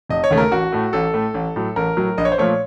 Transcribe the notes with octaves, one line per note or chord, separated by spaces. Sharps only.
F1 D#5
C#5
D#2 C#3 A3
A#4
A1 F#4
A2 A3
A1 A4
A2 A3
A1
A2 F#3
A1 A#4
A2 F#3
A#1 D#5
C#5
C5
A#2 F3 A3 C#5